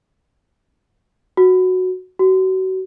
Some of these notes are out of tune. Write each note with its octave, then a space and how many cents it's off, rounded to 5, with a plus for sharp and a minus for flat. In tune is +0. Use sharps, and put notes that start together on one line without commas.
F#4 -5
F#4 +30